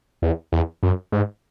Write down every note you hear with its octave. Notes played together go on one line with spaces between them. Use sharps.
E2
E2
F#2
G#2